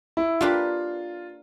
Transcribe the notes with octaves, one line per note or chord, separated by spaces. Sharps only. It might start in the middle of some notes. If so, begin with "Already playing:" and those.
E4
A#3 D4 F4 G4 B4